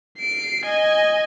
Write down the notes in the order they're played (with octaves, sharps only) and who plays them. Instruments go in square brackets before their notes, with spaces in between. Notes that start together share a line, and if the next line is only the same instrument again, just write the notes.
[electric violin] C7 D7
D#5 G#5